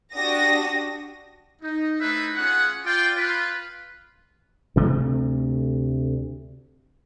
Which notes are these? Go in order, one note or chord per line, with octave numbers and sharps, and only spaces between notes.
D4 F#4 G4 D#6 A#6
D#4
A3 D#4 E4 B4 C5 E5
C#4 F4 G#4 F#5
F4 D5 G5
F4 B4
D2 C3 A3